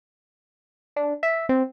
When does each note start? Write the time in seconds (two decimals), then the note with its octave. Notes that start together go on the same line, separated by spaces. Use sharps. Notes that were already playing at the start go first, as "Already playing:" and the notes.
0.96 D4
1.23 E5
1.49 C4